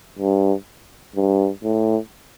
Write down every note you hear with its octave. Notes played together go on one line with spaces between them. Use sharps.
G2
G2
A2